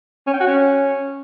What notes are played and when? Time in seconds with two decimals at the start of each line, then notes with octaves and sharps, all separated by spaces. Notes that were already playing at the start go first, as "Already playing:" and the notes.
0.27 C#4
0.33 G5
0.40 F#4
0.47 C#4